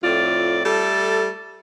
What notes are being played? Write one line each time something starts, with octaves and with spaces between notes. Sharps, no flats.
F2 A2 F4 D5
G3 A3 A4